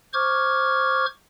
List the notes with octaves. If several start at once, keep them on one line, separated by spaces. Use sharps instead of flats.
C5 C#6 D6 F6 G#6